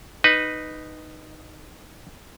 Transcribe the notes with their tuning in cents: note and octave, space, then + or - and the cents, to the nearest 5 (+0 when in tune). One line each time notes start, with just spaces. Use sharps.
D#4 -10 B4 +0